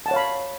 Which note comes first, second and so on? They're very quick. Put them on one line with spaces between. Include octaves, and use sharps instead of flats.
A5 F#5 C#5 F5 B5